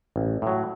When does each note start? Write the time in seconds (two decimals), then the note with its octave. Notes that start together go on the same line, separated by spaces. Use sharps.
0.16 A1
0.42 A2 F#3